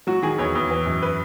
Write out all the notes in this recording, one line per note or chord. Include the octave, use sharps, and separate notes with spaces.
F#3 F#4
D#3 G#4
E2 C#5
E2
E3
F#2
B4